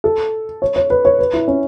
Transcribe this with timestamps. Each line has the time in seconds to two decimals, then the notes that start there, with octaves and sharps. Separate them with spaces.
0.04 A4
0.62 C#5
0.76 C#5
0.90 B4
1.05 C#5
1.19 B4
1.33 E4
1.48 C#4